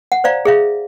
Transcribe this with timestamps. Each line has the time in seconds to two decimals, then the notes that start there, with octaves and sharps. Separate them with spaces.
0.12 F#5
0.24 C5 D5 F5 A#5
0.45 G#4 E5 F5